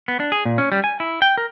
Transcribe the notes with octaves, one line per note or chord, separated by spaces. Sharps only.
B3
D4
G#4
A#2
C#4
G3
G#5
E4
G5
A#4